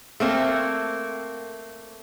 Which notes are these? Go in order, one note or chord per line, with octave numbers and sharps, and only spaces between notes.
A3 A#3 C4